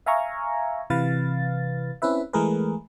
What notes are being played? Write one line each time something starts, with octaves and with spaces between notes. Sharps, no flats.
E5 F5 G#5 A#5 C#6
C3 E3 B4 F5 A6
C4 C#4 E4 B4 E5
E3 G#3 A3 G#4 A#4 B4